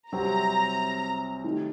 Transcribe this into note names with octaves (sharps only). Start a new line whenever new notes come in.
C2 C3 F#3 C4 G4 A#5
D#3 F#3 A3 D#4 G4